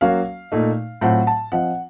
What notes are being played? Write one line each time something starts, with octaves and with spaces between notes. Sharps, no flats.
F#3 A#3 C#4 F#4 F5
A#2 A3 D#4
A2 F#3 C4 F4 C5 F#5
A5
F3 C4 F4 C5 D#5 F#5